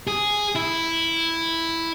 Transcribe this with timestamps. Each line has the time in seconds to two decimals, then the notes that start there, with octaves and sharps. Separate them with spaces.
0.07 G#4
0.55 E4